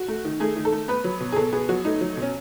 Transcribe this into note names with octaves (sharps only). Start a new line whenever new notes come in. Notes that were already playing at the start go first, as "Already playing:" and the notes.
Already playing: F#4
A3
D#3
A3 G#4
D#3
A4
A3
B3 B4
F#3
B2
G#4
B2 A4
B3 G#4
F#3 F#4
A3 D#4
F#3
B2
C#4